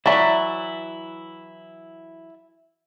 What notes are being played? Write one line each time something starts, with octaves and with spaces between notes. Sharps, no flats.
E3 F#3 E4 D5 E5